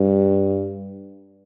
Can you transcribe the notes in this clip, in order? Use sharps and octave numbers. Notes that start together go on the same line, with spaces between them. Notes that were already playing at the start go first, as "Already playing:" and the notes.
Already playing: G2